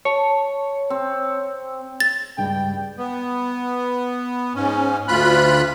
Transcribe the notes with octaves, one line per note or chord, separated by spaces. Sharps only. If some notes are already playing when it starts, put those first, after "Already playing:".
C#5 A5
C4
A6
C#2 G2 G3 G5
B3
G#2 C#4
D2 F4 B5 F#6